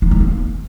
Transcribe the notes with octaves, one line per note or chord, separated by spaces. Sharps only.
D#4
G#3
A#3